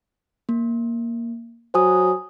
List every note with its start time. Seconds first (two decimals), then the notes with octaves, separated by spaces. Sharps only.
0.49 A#3
1.74 F#3 C5 G#5 D#6